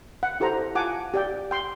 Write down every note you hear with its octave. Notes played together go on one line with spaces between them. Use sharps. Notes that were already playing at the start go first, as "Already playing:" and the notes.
F#5
E4 G4 A4 C5 A#5
F4 F#5 G#5 A5 D6
G4 D5 G5
G5 C6